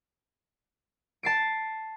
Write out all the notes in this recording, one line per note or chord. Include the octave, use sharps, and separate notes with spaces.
A5 C7 D7